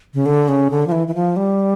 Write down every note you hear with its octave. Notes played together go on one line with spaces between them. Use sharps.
C#3
D3
C#3
D3
F3
E3
E3
F3
G3